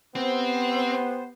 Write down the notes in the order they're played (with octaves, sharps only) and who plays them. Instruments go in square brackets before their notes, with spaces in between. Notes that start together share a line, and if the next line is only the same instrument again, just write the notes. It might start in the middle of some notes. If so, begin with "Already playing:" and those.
[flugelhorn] B3 [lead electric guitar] C4 [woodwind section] G4 C5